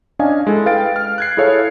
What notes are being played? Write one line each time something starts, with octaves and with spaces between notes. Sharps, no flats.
C#4 D4 D5 D#5 F5 G#5
G#3 E4 A4
B4 F5 G5 A6 D7
F6
F#6 G#6 C7
E4 G#4 A4 C#5 F5